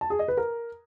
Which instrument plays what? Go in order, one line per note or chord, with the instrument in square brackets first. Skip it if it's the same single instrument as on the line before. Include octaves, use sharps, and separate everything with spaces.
[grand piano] A5
G#4
D#5
B4
A#4